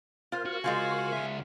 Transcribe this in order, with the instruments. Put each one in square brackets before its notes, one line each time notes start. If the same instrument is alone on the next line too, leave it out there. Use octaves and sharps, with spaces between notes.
[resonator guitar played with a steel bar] F4 C5 [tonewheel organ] A#4 F5 F6
[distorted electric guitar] F#4
[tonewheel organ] C#3 A#4 C#6 [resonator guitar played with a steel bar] G#3 F4 C5 [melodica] F5 G#5
[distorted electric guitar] C#2 E5